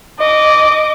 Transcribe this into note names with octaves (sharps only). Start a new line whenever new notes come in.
D#5 D6